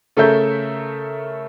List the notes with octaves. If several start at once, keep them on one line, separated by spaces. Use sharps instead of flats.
C#3 A3 A4 A#4 E5 G6